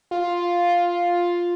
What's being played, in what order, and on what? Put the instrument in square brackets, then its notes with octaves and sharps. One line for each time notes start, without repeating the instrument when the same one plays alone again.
[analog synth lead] F4